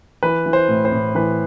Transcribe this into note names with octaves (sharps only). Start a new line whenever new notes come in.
E3 B4
E3
C5
A2
C5
A2
E3 B4